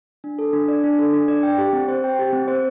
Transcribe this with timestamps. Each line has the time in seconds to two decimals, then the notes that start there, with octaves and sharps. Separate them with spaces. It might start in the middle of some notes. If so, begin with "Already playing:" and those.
0.24 D4
0.39 A4
0.53 D4
0.68 D5
0.84 D4
0.99 A4
1.14 D4
1.28 D5
1.43 G5
1.58 G4
1.73 C4
1.88 C5
2.04 G5
2.19 G4
2.33 C4
2.48 C5